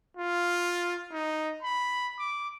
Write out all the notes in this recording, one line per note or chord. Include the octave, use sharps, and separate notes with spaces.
F4
D#4
B5
D6